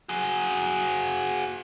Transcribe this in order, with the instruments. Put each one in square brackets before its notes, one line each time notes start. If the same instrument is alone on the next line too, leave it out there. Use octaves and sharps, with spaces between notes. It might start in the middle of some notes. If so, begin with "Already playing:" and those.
[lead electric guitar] F#4 G#4